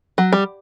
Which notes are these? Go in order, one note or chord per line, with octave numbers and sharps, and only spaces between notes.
F#3
G3